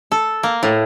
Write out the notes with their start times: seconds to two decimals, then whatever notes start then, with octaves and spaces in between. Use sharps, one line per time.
0.12 A4
0.43 A#3
0.63 A2